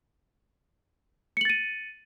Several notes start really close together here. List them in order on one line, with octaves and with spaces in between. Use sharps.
C#7 F#7 A6 D#7